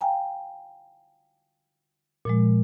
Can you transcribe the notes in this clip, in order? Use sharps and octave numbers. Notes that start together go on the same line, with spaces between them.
F5 G5 G#5 A#5
A#2 F3 G#3